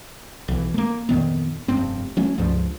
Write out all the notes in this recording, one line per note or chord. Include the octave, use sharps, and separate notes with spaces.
B1 E3
A3 A#3
F2 A#2 D#3 B3
F1 G2 C4
F#3 A3 C#4
C#2 G2 F3